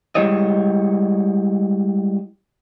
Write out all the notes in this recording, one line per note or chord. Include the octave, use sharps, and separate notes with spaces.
G3 G#3 E4 G4 C#5 D#5